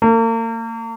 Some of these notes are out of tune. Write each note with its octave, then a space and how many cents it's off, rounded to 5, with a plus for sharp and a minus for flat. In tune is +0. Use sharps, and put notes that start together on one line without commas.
A#3 -40